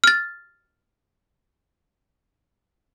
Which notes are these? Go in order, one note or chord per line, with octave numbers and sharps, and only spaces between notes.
F6 A6